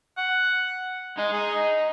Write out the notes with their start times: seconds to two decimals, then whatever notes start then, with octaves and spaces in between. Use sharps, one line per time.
0.17 F#5
1.17 G#3 D#4 D#5
1.33 G#4